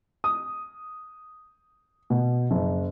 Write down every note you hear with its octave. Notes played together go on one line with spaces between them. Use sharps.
D#6
B2
F#1